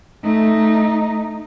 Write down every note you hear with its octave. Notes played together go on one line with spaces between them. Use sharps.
A3 D#4